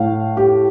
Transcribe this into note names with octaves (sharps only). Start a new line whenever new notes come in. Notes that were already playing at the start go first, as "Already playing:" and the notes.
Already playing: A2 F5
G4